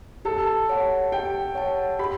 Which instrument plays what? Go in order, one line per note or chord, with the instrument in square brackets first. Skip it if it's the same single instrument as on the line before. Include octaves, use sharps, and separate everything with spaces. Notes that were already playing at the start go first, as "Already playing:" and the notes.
[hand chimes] G4 [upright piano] A4
[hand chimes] C#5 F#5 A5
[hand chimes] G4 [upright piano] G5
[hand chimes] C#5 F#5 A5
[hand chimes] G4 [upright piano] B5